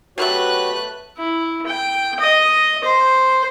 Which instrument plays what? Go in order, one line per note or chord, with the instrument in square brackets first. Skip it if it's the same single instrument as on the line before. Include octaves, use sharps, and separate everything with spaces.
[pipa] B2 F#3 A3 [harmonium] F#4 G4 C#5 [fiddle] B4 F#6
[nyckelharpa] E4
G5
D#5
C5